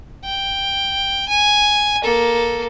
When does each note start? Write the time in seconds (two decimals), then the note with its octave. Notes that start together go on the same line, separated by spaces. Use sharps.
0.25 G5
1.28 G#5
2.04 A#3 A4